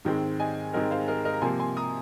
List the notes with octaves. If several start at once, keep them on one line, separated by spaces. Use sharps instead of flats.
G#2 D#3 G#3 C4
D#5 G#5
G#2 D#3 G#3 C4 A#4 D#5
C5 F5
A#4 D#5
A#4 D#5
A#5
C3 F3 A#3 G#5 C6
G#5 C6
A#5 D#6